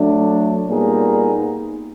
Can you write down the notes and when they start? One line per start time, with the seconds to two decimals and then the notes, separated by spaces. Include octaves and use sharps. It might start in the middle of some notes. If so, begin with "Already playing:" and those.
Already playing: F#3 A3 D4
0.68 A#2 G3 B3 D#4 G#4